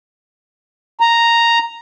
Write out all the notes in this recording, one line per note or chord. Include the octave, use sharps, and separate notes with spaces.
A#5